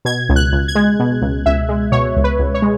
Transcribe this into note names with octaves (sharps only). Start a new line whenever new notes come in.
B2 G#6
C#2
F#6
C#2
G#6
G#3
B2
C#2
C#2 E5
G#3
B2 C#5
C#2
B4
C#2
C#5
G#3